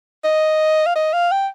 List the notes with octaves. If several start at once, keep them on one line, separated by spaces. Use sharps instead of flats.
D#5
F5
D#5
F5
G5